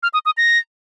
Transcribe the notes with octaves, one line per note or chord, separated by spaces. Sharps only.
F6
D#6
D#6
A#6